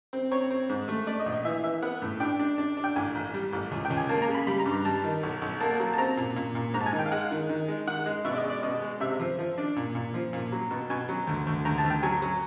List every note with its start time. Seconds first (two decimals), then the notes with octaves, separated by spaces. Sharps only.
0.13 C4
0.31 C4 C#5
0.50 C4
0.69 G#2
0.88 A3
1.07 A3 D5
1.20 D#5
1.26 A#1
1.32 D#5
1.45 E3 E5
1.64 E3 E5
1.83 B3 F#5
2.02 A2
2.20 D4 G5
2.39 D4
2.58 D4
2.77 D4
2.84 G5
2.96 A1 G#5
3.15 A1
3.34 G3
3.53 A1
3.71 C#2
3.85 G5
3.90 C#2
3.97 G#5
4.09 A#3 A5
4.22 A#5
4.28 C#3
4.34 B5
4.47 G3 B5
4.59 A#5
4.66 G2
4.72 A#5
4.85 G3 A5
5.04 D#3
5.23 B1
5.42 B1
5.60 A#3 A5
5.79 F#3
5.94 A5
5.98 C4 A#5
6.17 A#2
6.36 A#2
6.55 A#2
6.74 G#2 A#5
6.81 A5
6.86 G#5
6.93 D#3
6.99 G5
7.06 F5
7.12 G#3 F#5
7.31 D#3
7.49 D#3
7.68 G#3
7.87 D#3 F#5
8.06 G#3
8.24 B2 E5
8.32 D5
8.37 D#5
8.44 G#3
8.50 D5
8.63 B2 D#5
8.82 G#3
9.00 C3 E5
9.20 F3
9.39 F3
9.58 D4
9.76 A#2
9.95 A#2
10.14 F3
10.33 A#2
10.52 F#3
10.71 B2
10.90 B2 G#5
11.09 F#3
11.27 D2
11.47 D2
11.65 D2 A#5
11.78 A5
11.84 D2
11.90 G5
12.03 F#3 G#5
12.22 F#3